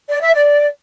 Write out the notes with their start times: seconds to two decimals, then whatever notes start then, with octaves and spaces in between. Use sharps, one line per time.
0.09 D5
0.21 E5
0.34 D5